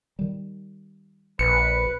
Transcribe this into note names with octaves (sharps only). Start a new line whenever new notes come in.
D#3 G3
A#1 B4 C#7